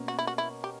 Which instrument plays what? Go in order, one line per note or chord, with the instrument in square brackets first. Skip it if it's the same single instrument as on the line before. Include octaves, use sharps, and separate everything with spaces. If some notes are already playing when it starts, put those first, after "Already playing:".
Already playing: [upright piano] B2 A#3 C#4
[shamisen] F#4
E4
F#4
E4
G4